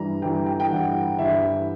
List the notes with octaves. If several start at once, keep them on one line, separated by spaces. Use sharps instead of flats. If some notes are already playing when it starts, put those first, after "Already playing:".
Already playing: G2 E3 G3 A#5
G2 E3 G3 G5
G5
G5
G2 E3 G3 F#5
G2 E3 G3 E5